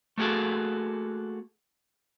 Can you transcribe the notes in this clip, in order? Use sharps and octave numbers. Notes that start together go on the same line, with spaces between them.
A3 A#3 F#4 G#4 A4